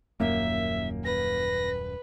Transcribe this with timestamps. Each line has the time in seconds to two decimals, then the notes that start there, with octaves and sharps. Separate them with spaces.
0.20 D#1 F#2 A#3 E5
1.05 B4 A#6